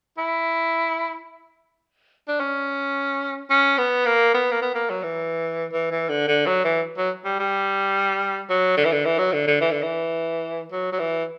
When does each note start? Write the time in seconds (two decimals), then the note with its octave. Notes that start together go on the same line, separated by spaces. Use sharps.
0.18 E4
2.28 D4
2.40 C#4
3.50 C#4
3.78 B3
4.06 A#3
4.34 B3
4.52 A#3
4.62 B3
4.75 A#3
4.90 F#3
5.03 E3
5.73 E3
5.92 E3
6.09 D3
6.28 D3
6.47 F#3
6.65 E3
6.98 F#3
7.25 G3
7.40 G3
8.50 F#3
8.77 D3
8.85 E3
8.93 D3
9.05 E3
9.19 F#3
9.33 D3
9.47 D3
9.61 E3
9.71 D3
9.83 E3
10.72 F#3
10.92 F#3
10.99 E3